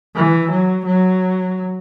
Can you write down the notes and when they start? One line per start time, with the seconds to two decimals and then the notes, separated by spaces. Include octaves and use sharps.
0.15 E3
0.51 F#3
0.86 F#3